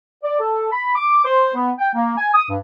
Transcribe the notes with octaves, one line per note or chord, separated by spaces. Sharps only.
D5
A4
B5
D6
C5
B3
G5
A#3
G#5
D#6
G2